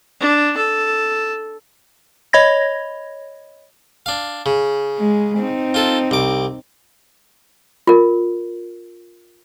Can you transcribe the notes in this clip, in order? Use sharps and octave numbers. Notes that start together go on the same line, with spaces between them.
D4
A4
C#5 D#5 B5 G#6 A#6
D4 F5
C#3
G#3
C4 D#4
F4 A4
C2 D6
F4 A#4